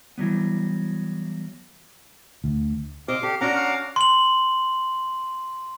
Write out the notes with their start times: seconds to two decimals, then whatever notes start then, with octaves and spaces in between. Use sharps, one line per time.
0.18 E3 F#3 G3 B3
2.44 D2
3.08 C3 C5 D#5 F5 D6
3.23 D3 G4 A4
3.41 C#4 D4 F#4 A#4 F#5 A#5 D6
3.56 F5
3.96 C6 F#7